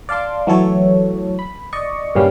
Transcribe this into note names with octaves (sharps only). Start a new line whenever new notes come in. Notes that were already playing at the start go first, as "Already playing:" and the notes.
D5 F5 A5 C6 D6
E3 F#3 A3 A4 C#5
B5
D5 D#5 C#6
G2 A#2 C#3 G3 C#4 F5